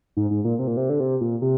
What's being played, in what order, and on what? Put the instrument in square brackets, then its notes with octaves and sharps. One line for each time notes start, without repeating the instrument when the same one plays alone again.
[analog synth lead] G#2
G#2
A#2
C3
A#2
C3
D3
C3
A#2
C3